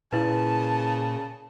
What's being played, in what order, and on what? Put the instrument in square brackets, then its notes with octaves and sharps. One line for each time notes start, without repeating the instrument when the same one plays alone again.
[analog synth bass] A#2 [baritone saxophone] C#3 [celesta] E4 B4 [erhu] A5